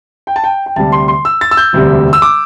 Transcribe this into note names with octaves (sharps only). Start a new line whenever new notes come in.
G5
A5
G5
G5
D2 C3 G3 A5
C6
C6
E6
A6
E6
G6
E1 D2 C3 G3
E6
D6